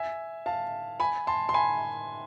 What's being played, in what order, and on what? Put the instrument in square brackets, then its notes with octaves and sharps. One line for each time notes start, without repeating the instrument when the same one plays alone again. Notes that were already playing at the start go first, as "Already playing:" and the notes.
Already playing: [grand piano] E5 G#5
F5 A5
G#5 B5
A5 C6
C6
G#5 B5